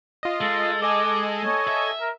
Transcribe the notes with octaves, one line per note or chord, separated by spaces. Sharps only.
F4 D#5
G#3 A4
A4 D#5 G#5 D6
C#5
E5
A#4